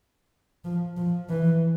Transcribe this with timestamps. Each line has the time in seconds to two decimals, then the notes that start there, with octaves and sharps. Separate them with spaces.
0.65 F3
0.97 F3
1.29 E3